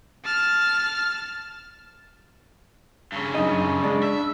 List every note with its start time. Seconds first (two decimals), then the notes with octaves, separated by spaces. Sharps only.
0.25 A5 F6
3.12 G2 C#3
3.34 F#2 D#4 D#5
3.84 G#3 D4
4.03 E5